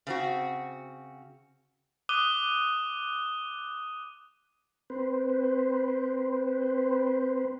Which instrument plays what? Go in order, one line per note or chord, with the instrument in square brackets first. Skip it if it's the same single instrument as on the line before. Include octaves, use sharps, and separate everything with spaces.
[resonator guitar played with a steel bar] C#3 C4 F#4
[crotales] D6 D#6 F#6 D#7 G7
[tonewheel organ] C4 B4 C5